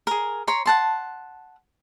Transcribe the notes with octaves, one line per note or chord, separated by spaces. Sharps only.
G#4 A#4
C#5 A#5 C6
F#5 A5 C6